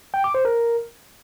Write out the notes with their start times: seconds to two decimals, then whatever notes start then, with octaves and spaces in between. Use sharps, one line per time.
0.14 G5
0.24 D6
0.34 C5
0.45 A#4